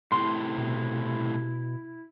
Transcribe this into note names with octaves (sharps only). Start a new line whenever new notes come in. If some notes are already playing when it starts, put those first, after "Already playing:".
A2 C3 E4 C6
B2